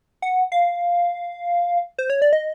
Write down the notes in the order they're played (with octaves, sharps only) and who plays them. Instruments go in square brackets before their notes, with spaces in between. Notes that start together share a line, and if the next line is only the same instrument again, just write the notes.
[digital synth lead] F#5
F5
C5
C#5
D5
D#5